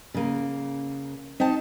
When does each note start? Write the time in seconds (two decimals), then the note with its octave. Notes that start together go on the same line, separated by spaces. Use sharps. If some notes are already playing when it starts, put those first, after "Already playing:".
0.14 C#3 A#3
1.40 C4 D#4 G5 A5